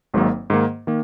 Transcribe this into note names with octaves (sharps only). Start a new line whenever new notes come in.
G#1 G#2 D#3 F#3 A#3
G#2 D#3 A#3
D#3 A#3